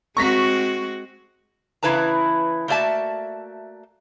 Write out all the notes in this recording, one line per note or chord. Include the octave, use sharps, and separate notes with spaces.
G#3 C4 F#4 C#6 A#6 B6
C#3 E3 E4 B4 A5 A#5
A3 A#3 F#4 D5 E5 A5